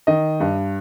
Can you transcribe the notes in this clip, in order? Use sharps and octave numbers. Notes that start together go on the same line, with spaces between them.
D#3 D#5
G2